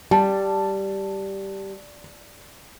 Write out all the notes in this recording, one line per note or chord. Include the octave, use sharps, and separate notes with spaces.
G3 A5